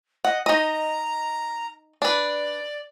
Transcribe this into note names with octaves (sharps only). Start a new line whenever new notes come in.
D#5 F#5
D#4 D#5 A#5
D4 B4 D5